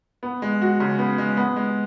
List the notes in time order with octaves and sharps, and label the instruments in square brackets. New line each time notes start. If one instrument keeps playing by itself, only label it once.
[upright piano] B3
G#3
F#4
C#3
B3
G#3
B3
G#3